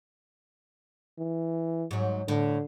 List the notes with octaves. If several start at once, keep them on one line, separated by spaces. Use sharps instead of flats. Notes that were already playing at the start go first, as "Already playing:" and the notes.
E3
G#2 F#3
A2 D3